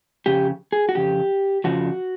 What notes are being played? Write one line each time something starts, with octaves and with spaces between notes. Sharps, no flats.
F2 C#3 G4
G#4
F#4
F2 C#3 G4
F2 C#3 F3 F#4